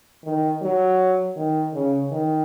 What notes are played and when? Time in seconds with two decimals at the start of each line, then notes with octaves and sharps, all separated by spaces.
0.24 D#3
0.62 F#3
1.37 D#3
1.74 C#3
2.12 D#3